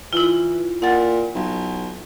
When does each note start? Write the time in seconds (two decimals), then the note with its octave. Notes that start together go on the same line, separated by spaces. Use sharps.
0.13 E3 E4 F4
0.82 A#2 F#5 A6
1.35 B1